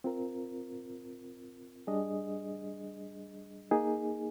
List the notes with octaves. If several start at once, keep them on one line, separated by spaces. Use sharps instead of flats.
C4 F4 A#4
G3 D4 G#4 D#5
A#3 D#4 G#4